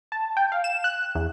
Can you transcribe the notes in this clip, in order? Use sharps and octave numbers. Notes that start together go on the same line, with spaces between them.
A5
G5
F5
E7
F#6
E2